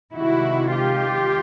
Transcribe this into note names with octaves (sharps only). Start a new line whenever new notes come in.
C3 D#3 G#3 E4 F#4
F4 G4